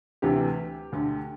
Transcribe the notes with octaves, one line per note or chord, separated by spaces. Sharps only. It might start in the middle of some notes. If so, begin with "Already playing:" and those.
D2 C3 E3 G4
D2 D3